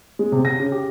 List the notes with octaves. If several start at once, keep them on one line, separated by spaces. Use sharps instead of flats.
G#3
C3
A#6
C#3
G4